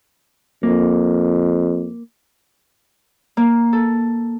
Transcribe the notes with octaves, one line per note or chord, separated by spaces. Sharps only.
F2 A#3
A#3
A4